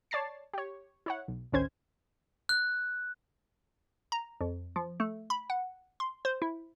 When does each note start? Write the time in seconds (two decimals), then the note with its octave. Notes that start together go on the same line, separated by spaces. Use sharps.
0.11 C#5 D5 A5 A6 C7
0.53 G4 C#5
1.06 E4 C#5 F#5
1.28 B1
1.52 A1 D2 D#3 C#4 C5 G#6
2.49 F#6
4.12 A#5
4.41 F2
4.76 F3
5.00 A3
5.30 B5
5.50 F#5
6.00 C6
6.25 C5
6.42 E4